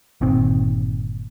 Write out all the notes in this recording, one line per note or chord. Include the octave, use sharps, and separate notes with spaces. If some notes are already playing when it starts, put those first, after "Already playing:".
G1 A#2 D#3 C4